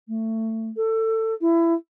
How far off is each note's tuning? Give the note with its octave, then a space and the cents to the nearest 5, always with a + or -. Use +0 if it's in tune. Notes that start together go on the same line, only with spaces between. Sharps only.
A3 +20
A4 +20
E4 +20